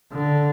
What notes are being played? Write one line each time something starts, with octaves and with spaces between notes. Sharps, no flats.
D3